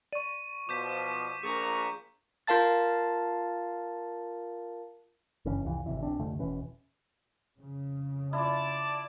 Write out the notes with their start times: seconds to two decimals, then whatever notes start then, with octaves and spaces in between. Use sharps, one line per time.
0.13 D5 C#6 D#7
0.69 B2 F3 D6 G6 B6
1.43 A#1 A#2 G#4 A#5 C#6
2.47 F4 A#4 F5 A5 A6
5.45 F#1 G2 E3 C#4
5.65 C2 F2 E3
5.86 G#1 C#2 C3 E3
6.03 B1 C4 D4
6.19 C2 F2 D3 A3
6.39 E1 B2 E3 C#4
7.58 F2 C#3
8.33 E4 F4 D5 A5